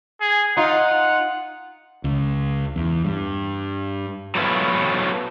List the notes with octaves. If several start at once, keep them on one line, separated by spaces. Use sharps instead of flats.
G#4
D#4 F4 F#5
C#2
E2
G2
F#3 A3 B3 E4 F4 B4